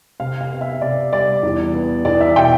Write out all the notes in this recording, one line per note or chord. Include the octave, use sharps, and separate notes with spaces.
C3 F5
F5
B3
E5
C3 D5
G3 D5
E2
B3
E2 D5
E5
B2 G5